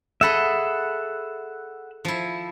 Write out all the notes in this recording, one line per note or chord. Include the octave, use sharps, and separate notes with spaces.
G#4 A4 D#5 E5 F#5 B5
F3 E4